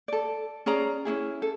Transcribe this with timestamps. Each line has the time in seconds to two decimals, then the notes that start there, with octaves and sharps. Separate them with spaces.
0.08 A4 D5
0.66 C#4 G#4 D5 A#5
1.05 C#4 D#4 E4 G#4
1.42 A4